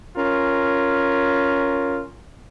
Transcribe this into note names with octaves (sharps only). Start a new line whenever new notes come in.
C#4 F4 A#4